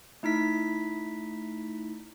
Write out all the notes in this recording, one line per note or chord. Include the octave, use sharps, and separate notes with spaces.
A3 D#4 E4 B6